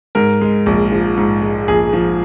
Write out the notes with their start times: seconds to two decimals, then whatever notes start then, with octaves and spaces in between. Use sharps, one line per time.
0.15 G#2 A#4
0.41 G#3
0.66 A#1
0.92 F3
1.17 G#2
1.42 G#3
1.68 A#1 G#4
1.93 F3